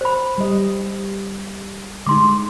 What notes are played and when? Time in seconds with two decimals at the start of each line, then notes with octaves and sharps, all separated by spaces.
0.01 C5 B5
0.38 G3 D#5
2.07 D3 G#3 D#4 C6 D6